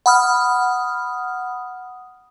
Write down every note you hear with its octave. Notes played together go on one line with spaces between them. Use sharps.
F#5 B5 D#6 F6